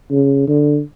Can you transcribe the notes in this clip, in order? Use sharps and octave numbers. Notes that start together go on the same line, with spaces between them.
C#3
D3